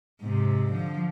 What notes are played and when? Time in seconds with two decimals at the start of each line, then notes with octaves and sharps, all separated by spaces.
0.22 G#2 C3
0.71 D3 F3